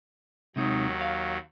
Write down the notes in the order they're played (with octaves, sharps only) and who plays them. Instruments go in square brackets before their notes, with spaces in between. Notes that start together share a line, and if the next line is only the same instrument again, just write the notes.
[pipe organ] D#2 F#3 [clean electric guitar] C3 G#3 D#4
[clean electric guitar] F5